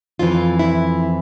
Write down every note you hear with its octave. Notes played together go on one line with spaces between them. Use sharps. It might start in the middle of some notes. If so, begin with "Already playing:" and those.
F2 E3 F4
E4